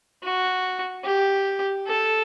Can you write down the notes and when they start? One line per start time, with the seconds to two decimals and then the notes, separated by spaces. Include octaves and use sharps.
0.23 F#4
1.04 G4
1.87 A4